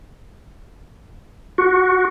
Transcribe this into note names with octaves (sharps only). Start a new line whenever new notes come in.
F#4